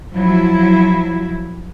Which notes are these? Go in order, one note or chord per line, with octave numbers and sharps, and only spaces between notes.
F3 F#3 E4